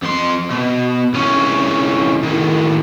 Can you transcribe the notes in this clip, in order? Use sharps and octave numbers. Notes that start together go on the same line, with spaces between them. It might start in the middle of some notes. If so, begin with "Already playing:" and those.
F2 C6
B2
C2 C#4
A2 D#3